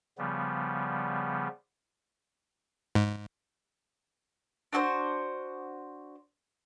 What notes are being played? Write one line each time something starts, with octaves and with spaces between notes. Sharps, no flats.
C#3 F3 G3 B3
G#2
D4 F#4 A4 C5